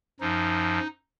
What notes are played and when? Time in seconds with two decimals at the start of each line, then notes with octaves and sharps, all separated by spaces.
0.20 F#2 F3 D#4